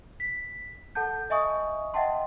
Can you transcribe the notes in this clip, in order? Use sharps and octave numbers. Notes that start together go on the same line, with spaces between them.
B6
A4 F#5 A5 G6
D#5 E5 G#5 C#6 D#6
D#5 E5 F#5 G5 A5 C6